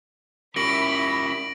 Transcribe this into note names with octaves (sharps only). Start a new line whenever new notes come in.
C#4 E4 G4 A#4 B5 A#6 D7 F#7